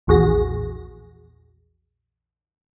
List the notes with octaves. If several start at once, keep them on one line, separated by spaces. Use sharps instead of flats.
A#1 E2 F#4 G#4 A#6